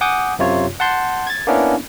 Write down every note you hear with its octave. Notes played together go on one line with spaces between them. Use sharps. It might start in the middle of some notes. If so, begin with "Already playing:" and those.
F#5 G#5 D6 D#6 G6
F#2 C3 F4 C#5
F#5 A5 C6 G6
G#6 A6
A#3 B3 C#4 D4 E4